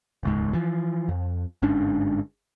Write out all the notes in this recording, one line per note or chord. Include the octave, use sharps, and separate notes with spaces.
D#1 C#2 G#2
E3 F3
F2
G1 G#2 C#4 D4